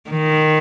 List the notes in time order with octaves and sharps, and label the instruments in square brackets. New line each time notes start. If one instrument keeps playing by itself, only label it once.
[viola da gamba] D#3